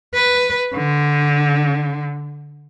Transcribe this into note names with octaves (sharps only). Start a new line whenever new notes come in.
B4
D3